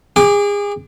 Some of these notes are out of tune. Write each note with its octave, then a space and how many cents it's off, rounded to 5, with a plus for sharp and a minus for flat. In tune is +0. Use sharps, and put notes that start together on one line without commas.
G#4 -30 D6 +0